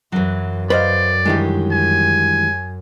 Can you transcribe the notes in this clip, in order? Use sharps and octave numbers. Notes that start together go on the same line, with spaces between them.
F#2 E3 F#3
B4 C5 D5 D#5 F5
G2 D#3 E3 G#3 G4
G#5